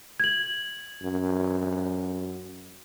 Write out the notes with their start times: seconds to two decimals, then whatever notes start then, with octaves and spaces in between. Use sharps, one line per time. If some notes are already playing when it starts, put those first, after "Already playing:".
0.20 G#6 F#7
1.02 F#2